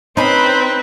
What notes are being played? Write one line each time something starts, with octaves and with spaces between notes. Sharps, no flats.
C4 C#4 D#4 B4 C5 B5